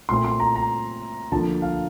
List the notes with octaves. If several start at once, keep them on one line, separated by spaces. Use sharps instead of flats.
A#2 A3 C4 C6
C6
A#5
A#5
D2 D3 F3 A#3 A5
F5